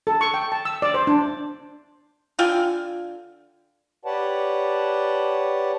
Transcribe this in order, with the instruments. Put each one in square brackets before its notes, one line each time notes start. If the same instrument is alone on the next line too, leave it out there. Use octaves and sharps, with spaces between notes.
[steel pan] A4
C#6
G5
A5
E6
D5
C5
D4
[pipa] D3 F4 G5 G#5
[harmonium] G4 B4 C#5 D5 F#5 A5